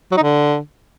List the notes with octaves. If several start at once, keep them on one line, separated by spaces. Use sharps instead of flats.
F#3
D#4
D3